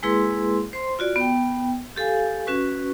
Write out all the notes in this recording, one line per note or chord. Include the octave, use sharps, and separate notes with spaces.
G#3 A#3 E4 G#4 B4 C6
C5 C6
F4 F#4 D5
B3 G5
G4 A4 F5 G#5
C#4 F#4 B4 C#6